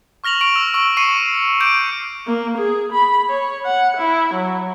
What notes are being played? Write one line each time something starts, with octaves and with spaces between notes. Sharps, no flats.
C#6 F6 A#6 F7 F#7
C#6 D7 F7
E6
C#6 E6 D7
C#6 C7 C#7 D#7
D6 G6 D7
A#3
G#4
B5
C#5
F#5
E4
F#3